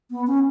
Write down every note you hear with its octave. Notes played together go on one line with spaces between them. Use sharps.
B3
C#4